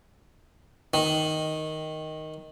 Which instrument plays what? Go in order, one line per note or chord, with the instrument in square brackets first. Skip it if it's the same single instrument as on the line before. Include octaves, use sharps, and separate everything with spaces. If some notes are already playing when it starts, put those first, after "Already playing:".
[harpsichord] D#3